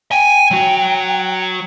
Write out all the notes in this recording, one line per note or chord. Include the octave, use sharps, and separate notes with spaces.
G5 G#5
F#3 F#4